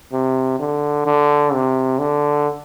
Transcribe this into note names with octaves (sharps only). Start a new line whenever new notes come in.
C3
D3
D3
C3
D3